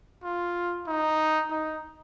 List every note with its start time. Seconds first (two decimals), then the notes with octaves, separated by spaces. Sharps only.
0.23 F4
0.87 D#4
1.50 D#4